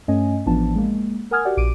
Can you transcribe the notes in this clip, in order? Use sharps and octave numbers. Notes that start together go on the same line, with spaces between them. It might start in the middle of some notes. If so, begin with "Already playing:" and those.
G2 A3 C#4 D#5 G#5
A1 E3 F3 B3 D4 A5
G#3 A#3
A#4 F#5 G#5 D#6 F6 G#6
F#4 G4 D5 F#5
A#1 D6 D7 D#7